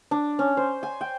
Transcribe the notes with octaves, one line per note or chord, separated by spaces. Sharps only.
D4
C#4
C5
G#5
G5